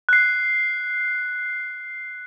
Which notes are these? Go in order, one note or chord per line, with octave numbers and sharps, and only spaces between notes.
F#6 C7